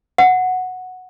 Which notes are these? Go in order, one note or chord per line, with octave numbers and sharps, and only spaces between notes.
F#5